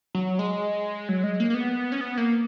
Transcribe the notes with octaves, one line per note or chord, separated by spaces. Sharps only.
F#3
G#3
F#3
G#3
A#3
A#3
B3
C#4
B3
A#3